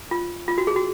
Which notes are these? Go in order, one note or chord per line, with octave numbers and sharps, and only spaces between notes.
F4
F4
F#4
G#4
F#4